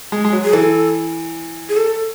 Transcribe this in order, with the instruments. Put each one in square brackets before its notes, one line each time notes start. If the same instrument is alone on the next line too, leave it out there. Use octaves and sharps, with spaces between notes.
[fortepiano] G#3
G#3
F#3
[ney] G#4
[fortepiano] E3 [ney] A4
[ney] G#4
A4